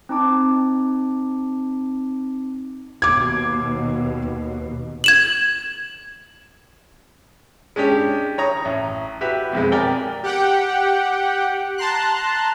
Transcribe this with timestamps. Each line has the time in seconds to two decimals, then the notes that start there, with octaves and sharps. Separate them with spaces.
0.09 C4 D#4 A5 D6
3.02 D#2 B2 D6 G#6
5.04 G#6 E7 F#7
7.76 G#3 C#4 D4 G4
8.38 C#5 A#5 D#6
8.65 A1
9.21 E4 F#4 G4 B4
9.53 B1 F2 G#3
9.72 A#4 D5 G5 G#5 A#5
10.23 G4 F#5 G5
11.78 A5 A#5 C6 F#6